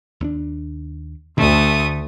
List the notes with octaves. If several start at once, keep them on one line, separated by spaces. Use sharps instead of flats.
D#2 C#4 D4
D2 D3 A3 D#6